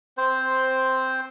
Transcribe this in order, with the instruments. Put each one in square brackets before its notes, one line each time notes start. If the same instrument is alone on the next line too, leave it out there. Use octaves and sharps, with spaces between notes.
[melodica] C4 C5